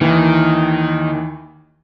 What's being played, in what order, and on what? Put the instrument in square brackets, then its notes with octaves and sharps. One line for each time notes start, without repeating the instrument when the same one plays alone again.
[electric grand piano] D#2 E3 [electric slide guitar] D#3